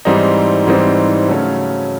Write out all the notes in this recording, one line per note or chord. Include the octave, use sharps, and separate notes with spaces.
G#2 E3 G3 C4 D#4
G#2 E3 G3 C4 D#4
C#3 F#3 A3 C#4